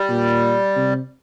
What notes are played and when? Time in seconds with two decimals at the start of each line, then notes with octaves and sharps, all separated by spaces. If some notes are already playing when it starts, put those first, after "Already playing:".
Already playing: G3
0.09 A#2
0.77 C3